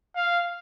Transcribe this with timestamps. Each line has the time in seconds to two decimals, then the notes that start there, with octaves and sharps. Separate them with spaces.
0.16 F5